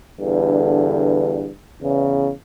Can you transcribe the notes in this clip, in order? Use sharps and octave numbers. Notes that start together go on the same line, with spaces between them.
E2 G2 D3
E2 C#3